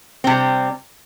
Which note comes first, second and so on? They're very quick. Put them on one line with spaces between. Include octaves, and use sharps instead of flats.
C4 C3 G3